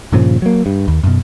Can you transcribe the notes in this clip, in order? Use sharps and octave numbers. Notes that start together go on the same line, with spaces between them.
G2 A#2 C#3 F3
F#3 A#3
G2
D#2
F#2 B2